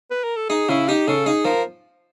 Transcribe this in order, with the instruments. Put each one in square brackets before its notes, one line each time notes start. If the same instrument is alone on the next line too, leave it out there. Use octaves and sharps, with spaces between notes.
[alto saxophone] B4
A#4
A4
[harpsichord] D#4 [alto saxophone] G#4
[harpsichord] C#3 [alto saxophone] E4
[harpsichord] D#4 [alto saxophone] G4
[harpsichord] C#3 [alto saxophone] A4
[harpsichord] D#4 [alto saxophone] G#4
[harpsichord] F3 [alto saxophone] A#4